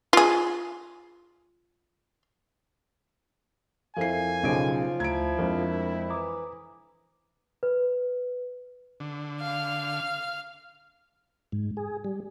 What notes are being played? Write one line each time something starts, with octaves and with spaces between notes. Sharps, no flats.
F4 G#4
F2 E4 A4 A#4 F5 G#5 C7
B1 C#3 F3 D7
D2 A3 E4 A#5 G#6 D7
F2 G#3 D4 A#4
E3 A#5 D6 D#6
B4
D3
F5 F6
G#2
G#4
G3